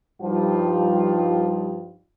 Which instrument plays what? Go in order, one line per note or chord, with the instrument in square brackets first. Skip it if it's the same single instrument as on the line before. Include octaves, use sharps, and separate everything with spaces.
[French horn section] G2 F3 G3 D#4 F4